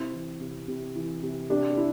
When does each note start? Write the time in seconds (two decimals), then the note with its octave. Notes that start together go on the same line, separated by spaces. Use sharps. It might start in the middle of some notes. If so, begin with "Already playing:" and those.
Already playing: C3 C4 E4
0.13 E3
0.40 C3
0.68 C3
0.96 E3
1.23 C3
1.50 C3 D4 G4
1.71 G4
1.77 E4